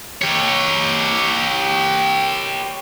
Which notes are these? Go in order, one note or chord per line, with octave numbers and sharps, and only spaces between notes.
G4 C#5